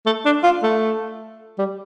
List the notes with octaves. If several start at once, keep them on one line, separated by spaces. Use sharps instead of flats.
A3
D4
F4
A3
G3